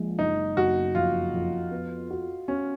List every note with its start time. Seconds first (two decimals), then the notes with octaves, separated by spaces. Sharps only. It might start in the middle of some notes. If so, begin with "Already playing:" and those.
Already playing: A#1 G#3
0.19 F#1 D#4
0.57 F#1 F#4
0.95 F2 F4
1.34 F2
1.71 B3
2.10 F#4
2.48 C#4 F#4